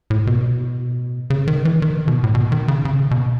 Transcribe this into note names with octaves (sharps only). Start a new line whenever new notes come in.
A2
B2
C#3
D#3
E3
D#3
B2
A2
B2
D#3
C#3
C#3
B2